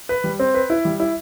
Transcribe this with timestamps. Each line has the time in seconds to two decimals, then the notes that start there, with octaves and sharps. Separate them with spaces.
0.09 B4
0.24 G3
0.39 C4
0.54 B4
0.70 E4
0.85 G3
1.00 E4